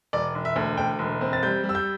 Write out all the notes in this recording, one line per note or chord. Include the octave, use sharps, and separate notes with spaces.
E1 D5
E1
E5
D2
D2 G5
E1
C4
A6
G3 G6
G3
E6
G6